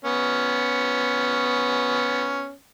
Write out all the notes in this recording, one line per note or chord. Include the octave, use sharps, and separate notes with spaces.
B3 C#4